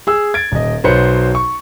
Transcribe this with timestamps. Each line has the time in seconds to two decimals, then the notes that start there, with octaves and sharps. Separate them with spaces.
0.07 G#4 E6
0.34 G#6 A6 D7
0.52 D#1 D#5
0.84 B1 F#3 B4 C5 C#7
1.35 C#6